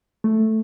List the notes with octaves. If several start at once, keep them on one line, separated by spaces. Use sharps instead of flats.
A3